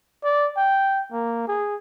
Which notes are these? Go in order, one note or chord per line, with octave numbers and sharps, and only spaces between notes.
D5
G5
A#3
G#4